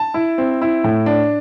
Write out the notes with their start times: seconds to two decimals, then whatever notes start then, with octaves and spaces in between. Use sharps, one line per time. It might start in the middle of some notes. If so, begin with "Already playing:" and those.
Already playing: A5
0.14 E4
0.38 C4
0.62 E4
0.84 A2
1.06 D4